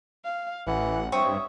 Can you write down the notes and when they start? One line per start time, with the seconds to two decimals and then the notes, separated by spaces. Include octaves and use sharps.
0.24 F5
0.67 A1 E3 F#5
1.12 G2 C4 C#5 E5 C#6 D#6